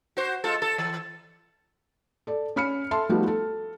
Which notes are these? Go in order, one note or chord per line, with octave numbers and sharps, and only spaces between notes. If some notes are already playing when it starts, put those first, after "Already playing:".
F#4 C5
G#3 F4 A4
A4
E3
A4 D5
C#4 B5 F6 C#7
A4 E5 A5 C6
F3 G3 A3 B3 D#4 F#4
A4